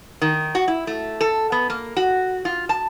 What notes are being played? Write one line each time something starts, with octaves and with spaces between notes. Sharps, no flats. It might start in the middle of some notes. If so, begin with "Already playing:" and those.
D#3
F#4
E4
A3
A4
B3
A#3
F#4
F4
A5